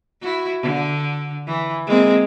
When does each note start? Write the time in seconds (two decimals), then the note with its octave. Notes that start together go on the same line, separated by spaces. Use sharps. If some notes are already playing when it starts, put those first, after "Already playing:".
0.21 E4 F#4
0.62 D3
1.47 E3
1.87 G#3 A#3 C4